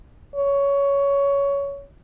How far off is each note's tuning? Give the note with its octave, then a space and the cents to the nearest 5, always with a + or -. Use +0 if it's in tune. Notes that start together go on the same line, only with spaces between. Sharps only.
C#5 +15